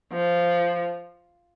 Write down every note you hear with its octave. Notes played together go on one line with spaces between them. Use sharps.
F3